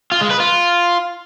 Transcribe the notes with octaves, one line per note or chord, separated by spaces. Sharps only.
F4
G#3
B4
F4